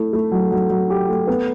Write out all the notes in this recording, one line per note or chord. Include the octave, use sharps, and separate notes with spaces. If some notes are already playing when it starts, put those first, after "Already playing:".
Already playing: A3 E4
A3
F#3
F#3
F#3
G4
A3
B3